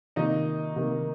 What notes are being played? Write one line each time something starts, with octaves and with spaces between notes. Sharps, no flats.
C3 D#3 A#3 D#4 D#5
C3 D#3 A#3